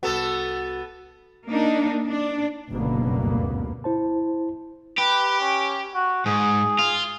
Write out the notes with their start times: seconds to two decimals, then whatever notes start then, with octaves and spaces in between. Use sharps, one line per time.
0.03 C2 B3 F#4 A4
1.47 A#3 D4 D#4
2.07 D4
2.71 F#1 D2 G2 B2 A#3 B3
3.84 E4 C5 A5
4.98 G4 B4
5.41 C#4
5.94 F#4
6.26 G#2 G#4
6.79 F4